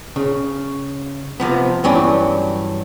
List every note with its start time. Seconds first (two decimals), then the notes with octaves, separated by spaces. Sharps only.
0.16 C#3
1.40 C3 F3 B3
1.84 G2 E3 F#3 C#4 D4